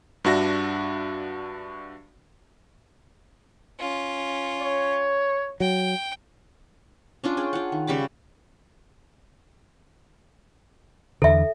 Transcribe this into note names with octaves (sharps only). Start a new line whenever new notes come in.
G2 D4 F#4 E5 A#6
C#4 F4
C#5
F#3 G5
C#4 D4 F4
G#4 D5 G5
F4 F#5
D#3
C#3 G3 B5 D6
E2 D3 A4 E5